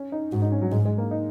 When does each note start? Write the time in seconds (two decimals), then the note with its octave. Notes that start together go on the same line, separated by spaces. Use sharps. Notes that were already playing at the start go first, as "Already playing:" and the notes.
Already playing: C#4
0.12 D#4
0.32 G#2 F#4
0.42 D#4
0.52 C#4
0.62 F#3
0.72 G#2 G#3
0.85 G#3
0.98 A#3
1.11 D#4